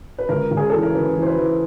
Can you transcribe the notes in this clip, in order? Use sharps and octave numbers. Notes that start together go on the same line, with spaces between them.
B4
C#2 A#4
C#2
G#4
E3 A4
A#4
C#3 B4
E3
C5
B4
E3